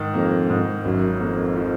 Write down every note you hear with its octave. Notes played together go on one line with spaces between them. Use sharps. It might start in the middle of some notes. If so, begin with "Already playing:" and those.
Already playing: G#2 D#3
F2 A#3
G#2
G#1 F#2
F2 A#3
F3